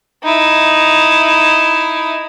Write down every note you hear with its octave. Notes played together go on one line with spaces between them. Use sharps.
D#4 E4